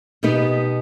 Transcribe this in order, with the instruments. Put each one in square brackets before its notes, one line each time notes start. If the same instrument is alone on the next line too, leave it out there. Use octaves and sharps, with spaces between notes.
[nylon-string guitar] B2 B3 D#4 G4 B4